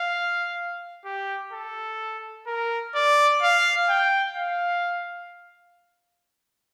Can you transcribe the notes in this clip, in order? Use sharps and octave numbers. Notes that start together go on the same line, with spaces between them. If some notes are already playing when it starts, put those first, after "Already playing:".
Already playing: F5
G4
A4
A#4
D5
F5
G5
F5